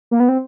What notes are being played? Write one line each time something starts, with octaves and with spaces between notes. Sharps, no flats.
A#3
B3
C4